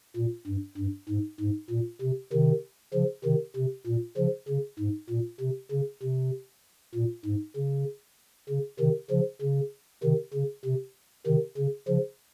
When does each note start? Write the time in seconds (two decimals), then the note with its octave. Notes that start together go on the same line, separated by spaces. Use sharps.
0.17 A#2
0.47 G2
0.78 G2
1.09 G#2
1.41 G#2
1.71 A#2
2.02 C3
2.33 C3 D#3
2.94 C#3 F3
3.25 C3 D#3
3.56 C3
3.87 A#2
4.17 C#3 F3
4.49 C#3
4.79 G#2
5.10 A#2
5.41 C3
5.72 C#3
6.03 C3
6.95 A#2
7.26 G#2
7.57 C#3
8.49 C#3
8.80 C3 D#3
9.11 C#3 F3
9.42 C#3
10.04 C3 D#3
10.34 C#3
10.65 C3
11.27 C3 D#3
11.58 C#3
11.88 C#3 F3